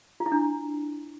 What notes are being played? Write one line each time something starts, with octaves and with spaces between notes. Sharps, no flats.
F4
E4
D4